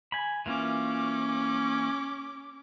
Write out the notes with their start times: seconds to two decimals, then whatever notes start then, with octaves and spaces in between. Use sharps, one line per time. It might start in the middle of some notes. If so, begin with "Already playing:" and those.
0.12 G#5 B5
0.46 E3 A#3 C#4 F4 D6